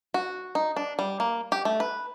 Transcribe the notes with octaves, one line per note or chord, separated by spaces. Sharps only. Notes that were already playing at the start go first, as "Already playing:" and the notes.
F#4
D#4
D4
G3
A#3
G4
A3
B4